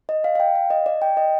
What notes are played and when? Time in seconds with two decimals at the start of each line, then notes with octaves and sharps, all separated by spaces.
0.09 D#5
0.24 F5
0.35 F5
0.40 G5
0.55 F5
0.70 D#5
0.86 D5
1.02 G5
1.17 D#5